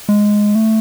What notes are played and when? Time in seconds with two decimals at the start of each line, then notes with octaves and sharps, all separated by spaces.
0.09 G#3
0.55 A3